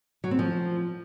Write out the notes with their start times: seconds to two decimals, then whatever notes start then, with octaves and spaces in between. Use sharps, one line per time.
0.24 F#3
0.31 C4
0.39 F3